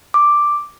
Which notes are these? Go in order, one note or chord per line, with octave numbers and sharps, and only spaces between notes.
D6